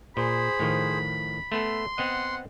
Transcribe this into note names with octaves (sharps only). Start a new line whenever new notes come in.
A#2 G#4 C5 B5
A2 D#3 F3
A3 B3 A4 C6
B3 C4 D#5 F#5